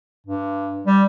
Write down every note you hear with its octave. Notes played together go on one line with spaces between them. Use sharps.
G2
G3